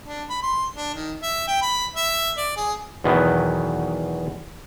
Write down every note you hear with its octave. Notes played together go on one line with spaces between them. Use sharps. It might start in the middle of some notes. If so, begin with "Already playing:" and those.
D4
B5
C6
D4
D#3
E5
G5
B5
E5
D5
G#4
E2 B2 D#3 F#3 B3